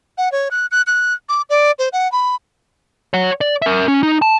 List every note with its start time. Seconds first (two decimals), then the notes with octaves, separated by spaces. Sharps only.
0.18 F#5
0.32 C#5
0.51 F#6
0.71 F#6
0.87 F#6
1.29 D6
1.50 D5
1.79 C5
1.93 F#5
2.12 B5
3.14 C#5 F#5
3.41 D5
3.62 A#4 E5
3.88 C#4
4.03 D#4
4.22 A5